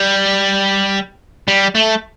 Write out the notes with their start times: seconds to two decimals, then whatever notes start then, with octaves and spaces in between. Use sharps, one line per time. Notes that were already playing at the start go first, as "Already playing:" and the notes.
Already playing: G3
1.48 G3
1.75 A3